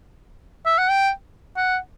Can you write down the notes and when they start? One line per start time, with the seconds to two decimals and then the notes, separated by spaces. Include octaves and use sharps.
0.66 E5
0.78 F#5
0.90 G5
1.57 F#5